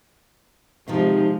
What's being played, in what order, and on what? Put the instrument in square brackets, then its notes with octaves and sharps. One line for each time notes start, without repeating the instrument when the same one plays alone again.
[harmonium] C3 [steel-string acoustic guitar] D#3 F#3 D#4 [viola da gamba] F3 G#3